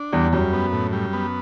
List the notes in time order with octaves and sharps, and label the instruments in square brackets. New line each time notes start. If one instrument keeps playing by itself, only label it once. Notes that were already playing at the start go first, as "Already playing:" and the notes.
Already playing: [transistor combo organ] D4
[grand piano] E2 [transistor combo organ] G3
[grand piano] F#2 [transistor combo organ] G3
[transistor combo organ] B3
A2
G3
B3